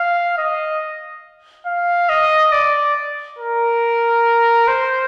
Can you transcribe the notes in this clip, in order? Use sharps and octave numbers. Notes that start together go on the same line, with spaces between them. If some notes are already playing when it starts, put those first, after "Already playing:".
Already playing: F5
D#5
F5
D#5
D5
A#4
C5